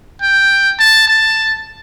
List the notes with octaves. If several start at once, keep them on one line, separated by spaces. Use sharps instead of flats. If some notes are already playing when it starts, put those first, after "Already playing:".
G5
A5
A5